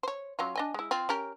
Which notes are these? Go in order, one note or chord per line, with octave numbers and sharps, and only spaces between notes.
C5 C#5
F#3 C#4 F4
D4 D#5 G#5
G#3 E4
C4 F4
C#4 G4 A#4